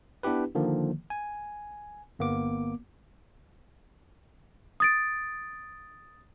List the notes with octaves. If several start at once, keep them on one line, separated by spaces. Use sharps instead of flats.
B3 D4 E4 G4 B4
D3 D#3 F3 A#3
G#5
G1 A#3 B3 D6
D#6 A6 D7